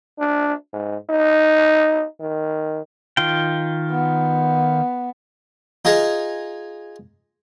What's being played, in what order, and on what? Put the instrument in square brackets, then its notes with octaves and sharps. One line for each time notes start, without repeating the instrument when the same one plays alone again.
[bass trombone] D4
G#2
D#4
D#3
[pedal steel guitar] D#3 F4 G5
[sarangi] B3
[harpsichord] D#4 F4 G#4 D#5